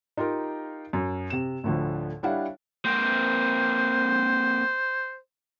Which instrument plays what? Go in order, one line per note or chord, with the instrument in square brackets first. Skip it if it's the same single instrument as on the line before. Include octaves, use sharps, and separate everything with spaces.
[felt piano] D#4 F4 G4 A#4
F#2
C3 E7
D2 A2 D3 F3
G3 D4 E4 C#5 F5 F#5
[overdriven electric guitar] A#3 C4 [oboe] C5